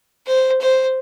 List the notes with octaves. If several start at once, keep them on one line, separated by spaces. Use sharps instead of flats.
C5
C5